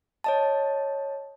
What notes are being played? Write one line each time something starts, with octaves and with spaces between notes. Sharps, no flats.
C#5 D#5 A5